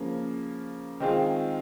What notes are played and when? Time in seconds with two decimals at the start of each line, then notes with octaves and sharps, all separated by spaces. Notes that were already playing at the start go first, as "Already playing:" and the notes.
Already playing: C#3 F3 A#3 C#4
1.00 D#3 G#3 C4 F4 G#4